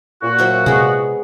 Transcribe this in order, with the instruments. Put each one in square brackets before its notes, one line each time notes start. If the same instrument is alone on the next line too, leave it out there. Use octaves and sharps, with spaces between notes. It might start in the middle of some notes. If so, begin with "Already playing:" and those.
[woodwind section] A#2 F#4
[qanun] F#3 C5 E5
[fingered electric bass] C3 [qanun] G#3 B3